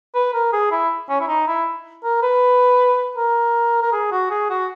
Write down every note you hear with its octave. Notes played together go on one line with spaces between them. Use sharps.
B4
A#4
G#4
E4
C#4
E4
D#4
E4
A#4
B4
A#4
A#4
G#4
F#4
G#4
F#4